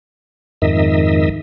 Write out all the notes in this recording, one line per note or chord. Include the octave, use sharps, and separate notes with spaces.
F2 G#2 D#3 D#5 E5